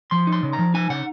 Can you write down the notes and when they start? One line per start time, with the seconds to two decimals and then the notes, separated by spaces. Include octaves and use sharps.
0.11 F3 C6
0.27 D#4
0.33 C6
0.43 C#3
0.53 A#5
0.59 F3
0.74 D#4 G#5
0.90 C#3 F#5